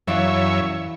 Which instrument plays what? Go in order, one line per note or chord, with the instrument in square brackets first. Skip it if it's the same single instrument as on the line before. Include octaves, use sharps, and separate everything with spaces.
[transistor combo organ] F#2 C#5 E5 [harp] E3 D5 F5